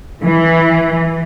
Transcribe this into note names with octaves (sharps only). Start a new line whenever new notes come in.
E3